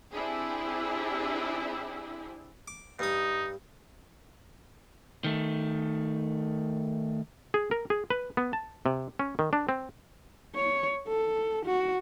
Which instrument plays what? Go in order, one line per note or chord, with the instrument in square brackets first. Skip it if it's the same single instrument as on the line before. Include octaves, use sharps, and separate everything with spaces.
[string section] C4 D4 E4 G4 G#4
[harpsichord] D6
[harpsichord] G2 D#6 [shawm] D#4
[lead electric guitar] D#3 A3
[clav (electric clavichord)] G#4
A#4
G#4
B4
B3
A5
C3
C#4
D#3
D4
C4
[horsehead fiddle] C#5
A4
F#4